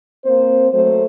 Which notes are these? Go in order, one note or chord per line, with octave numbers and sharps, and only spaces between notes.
A#3 C4 C5
F#3 A3 C5